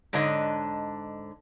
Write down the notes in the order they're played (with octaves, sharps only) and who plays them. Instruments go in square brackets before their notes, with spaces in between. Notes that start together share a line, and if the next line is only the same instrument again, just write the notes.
[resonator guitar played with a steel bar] G#2 D3 D4 C#5 D#5